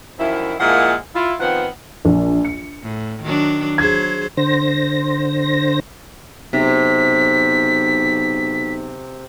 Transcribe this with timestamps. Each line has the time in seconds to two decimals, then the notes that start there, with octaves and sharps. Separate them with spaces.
0.19 F#2 D#3 F3 E4
0.60 A#2 F3 G#3 A#3 E4 F#5
1.15 E4 F4
1.40 D#3 F3 B3 C4 F#5
2.05 A#1
2.45 C#7
2.83 A2
3.23 D#3 F#3 D4
3.78 F#3 G#4 C5 G#6
4.37 D3 C5 A#6
6.53 B1 C3 B6